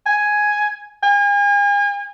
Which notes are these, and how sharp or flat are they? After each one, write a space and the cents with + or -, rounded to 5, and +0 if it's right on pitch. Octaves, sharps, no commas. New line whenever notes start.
G#5 +5
G#5 -40